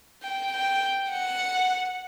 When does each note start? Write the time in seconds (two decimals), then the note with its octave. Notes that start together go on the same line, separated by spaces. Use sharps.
0.23 G5
0.53 G5
1.12 F#5